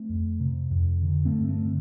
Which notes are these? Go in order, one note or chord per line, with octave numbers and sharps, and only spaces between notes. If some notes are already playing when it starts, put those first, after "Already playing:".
Already playing: A3 C4
F2
C3
F2
D3
A3 C4
G2
A3 C4
D3